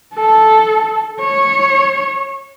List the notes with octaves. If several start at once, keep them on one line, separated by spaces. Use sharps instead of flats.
A4
C#5